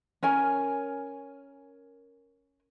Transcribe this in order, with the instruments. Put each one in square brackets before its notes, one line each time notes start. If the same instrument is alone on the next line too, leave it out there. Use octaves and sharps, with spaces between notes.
[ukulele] C#4 A#4 G#5